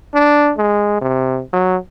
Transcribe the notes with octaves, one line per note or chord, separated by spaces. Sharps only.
D4
G#3
C3
F#3